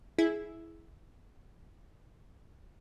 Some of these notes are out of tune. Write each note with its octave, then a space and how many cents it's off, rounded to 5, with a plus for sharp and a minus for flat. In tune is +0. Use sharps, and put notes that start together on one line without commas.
E4 +0 G#4 +15